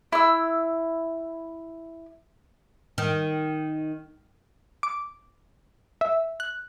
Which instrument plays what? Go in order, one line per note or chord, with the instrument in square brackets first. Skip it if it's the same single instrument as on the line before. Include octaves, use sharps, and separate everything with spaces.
[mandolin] E4 E6
[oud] D#3
[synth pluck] D6
E5
F#6